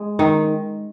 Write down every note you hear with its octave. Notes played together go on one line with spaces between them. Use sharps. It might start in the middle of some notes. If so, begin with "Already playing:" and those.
Already playing: G#3
D#3